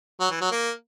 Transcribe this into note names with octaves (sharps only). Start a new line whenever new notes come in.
F#3
E3
F#3
A#3